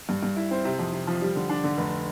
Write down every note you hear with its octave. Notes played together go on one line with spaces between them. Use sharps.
G2
G2
E4
C4
C3
F2
C3
F3
G3
D3
D4
D3
F1